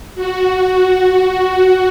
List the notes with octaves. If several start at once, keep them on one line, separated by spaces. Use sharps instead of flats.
F#4
F#4